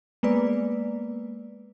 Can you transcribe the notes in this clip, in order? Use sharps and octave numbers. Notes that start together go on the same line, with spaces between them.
G#3 A#3 B3 B4 D5